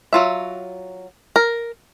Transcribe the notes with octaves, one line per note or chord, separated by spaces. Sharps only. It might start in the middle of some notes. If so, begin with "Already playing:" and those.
F#3 F4 E5
A#4